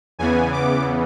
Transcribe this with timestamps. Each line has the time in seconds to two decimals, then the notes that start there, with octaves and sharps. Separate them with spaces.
0.19 E2 C#3 E3 B3 G#5
0.52 D6